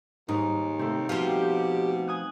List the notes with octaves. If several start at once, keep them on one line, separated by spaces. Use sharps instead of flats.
D#2 G#2 D#4
C3 A3 C4
B2 F3 F4 G4
G#5 D#6 F#6